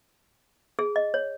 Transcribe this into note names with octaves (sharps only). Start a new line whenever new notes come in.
G#4
D#5
C#5